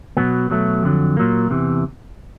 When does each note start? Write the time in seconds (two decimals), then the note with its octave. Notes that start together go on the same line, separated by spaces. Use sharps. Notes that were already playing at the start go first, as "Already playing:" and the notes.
0.17 B2 F#3 B3
0.50 B2 F#3 A3
0.83 F2 D3 F#3
1.17 A#2 F#3 A#3
1.50 E2 C3 E3